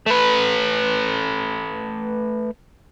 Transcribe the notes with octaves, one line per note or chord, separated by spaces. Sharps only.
A3 B4